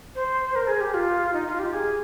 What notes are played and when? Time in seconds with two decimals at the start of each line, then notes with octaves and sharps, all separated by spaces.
0.15 C5
0.55 A#4
0.68 G#4
0.81 G4
0.94 F4
1.33 D#4
1.47 F4
1.59 G4
1.73 G#4